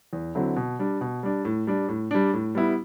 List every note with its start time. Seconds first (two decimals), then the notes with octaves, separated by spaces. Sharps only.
0.13 E2
0.35 D3 F#3 C4 E4
0.56 B2
0.79 G3 D4
1.01 B2
1.23 G3 D4
1.45 A2
1.67 G3 D4
1.88 A2
2.11 G3 D4
2.33 A2
2.55 G3 B3 E4